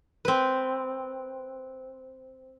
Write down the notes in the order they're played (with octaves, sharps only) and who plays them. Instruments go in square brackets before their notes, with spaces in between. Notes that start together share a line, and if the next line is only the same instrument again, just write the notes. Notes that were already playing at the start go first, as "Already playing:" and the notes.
[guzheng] C4 B4